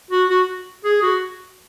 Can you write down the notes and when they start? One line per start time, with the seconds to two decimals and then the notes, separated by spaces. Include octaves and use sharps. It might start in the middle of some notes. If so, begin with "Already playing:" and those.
0.11 F#4
0.30 F#4
0.85 G#4
1.03 F#4